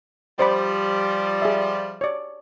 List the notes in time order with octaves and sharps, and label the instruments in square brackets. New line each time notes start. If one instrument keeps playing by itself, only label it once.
[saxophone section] F3 G3 [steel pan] C5 D5 B5
[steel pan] G#4 E5
C#5 D5